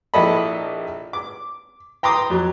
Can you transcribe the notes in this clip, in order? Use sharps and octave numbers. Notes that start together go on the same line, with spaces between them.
A#1 E4 G4 A4 D#5 B5
D6
G5 A#5 C6 D6 D#6
F2 F#3